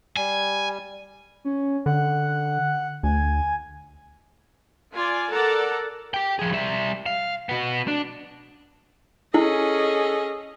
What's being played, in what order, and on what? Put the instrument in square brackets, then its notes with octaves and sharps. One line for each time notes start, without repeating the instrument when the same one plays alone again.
[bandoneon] G3 [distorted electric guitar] G#5
[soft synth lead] C#4
[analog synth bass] D3 [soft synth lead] F#5
[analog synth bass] D2 [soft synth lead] G#5
[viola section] F4 D5 G#5
A4 A#4 D5 F#5 A5 A#5
[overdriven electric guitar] G4 G5
F3 G#4
G3 E5
F5
B3 F#4
D4
[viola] C#4 D#5 [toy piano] E4 [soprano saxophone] G#4 [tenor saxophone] A4